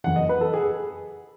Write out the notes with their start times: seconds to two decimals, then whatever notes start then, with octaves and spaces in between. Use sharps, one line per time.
0.04 F#1 F2 C#3 E3 F#5
0.16 D#5
0.29 B4
0.41 A4
0.54 G#4